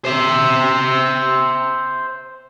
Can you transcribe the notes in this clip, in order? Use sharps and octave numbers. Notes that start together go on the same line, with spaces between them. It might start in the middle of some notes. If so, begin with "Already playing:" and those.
C5 E5